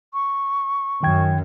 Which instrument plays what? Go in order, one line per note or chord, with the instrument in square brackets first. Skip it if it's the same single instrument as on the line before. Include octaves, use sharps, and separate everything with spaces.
[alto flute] C#6
[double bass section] F#2 [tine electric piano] D#3 G5 G#6